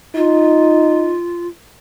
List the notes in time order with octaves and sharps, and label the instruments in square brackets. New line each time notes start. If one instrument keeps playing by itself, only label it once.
[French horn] D#4 [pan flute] F4